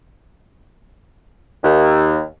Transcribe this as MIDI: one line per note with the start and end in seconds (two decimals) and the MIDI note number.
1.64 2.22 39